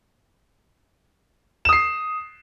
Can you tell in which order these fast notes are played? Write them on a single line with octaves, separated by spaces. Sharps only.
E7 D#6 C7